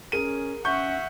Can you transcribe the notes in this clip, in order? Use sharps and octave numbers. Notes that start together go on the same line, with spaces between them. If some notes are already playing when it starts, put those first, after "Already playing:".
C#4 G#4 A#4 D#7
C#4 E5 F#5 C#6 G6